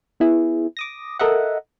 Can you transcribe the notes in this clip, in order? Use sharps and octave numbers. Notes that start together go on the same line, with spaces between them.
B3 E4 G#4
D6 D#6 A#6
A4 A#4 D#5 E5 F#5